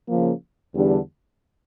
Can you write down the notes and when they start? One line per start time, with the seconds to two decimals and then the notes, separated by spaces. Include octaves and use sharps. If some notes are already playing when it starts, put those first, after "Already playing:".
0.09 C#3 F3 A#3
0.75 E2 D3 G3 D4 G4